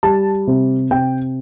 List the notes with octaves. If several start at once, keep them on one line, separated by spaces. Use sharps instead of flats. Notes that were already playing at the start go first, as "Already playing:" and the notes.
G3 A5
C3
C3 G5